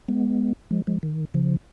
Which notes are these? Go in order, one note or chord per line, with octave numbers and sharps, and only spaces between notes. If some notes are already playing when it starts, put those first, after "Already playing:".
G#3 B3
F3 G#3
F3 G#3
D#3
C#3 F3